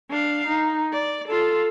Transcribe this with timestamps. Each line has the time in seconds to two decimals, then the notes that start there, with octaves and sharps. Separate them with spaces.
0.10 D4 F5
0.48 D#4
0.93 D5
1.28 F4 A4